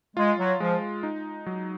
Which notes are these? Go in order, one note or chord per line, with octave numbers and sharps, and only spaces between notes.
G#3 F4
F#3
F3 G#3
D#4
F#3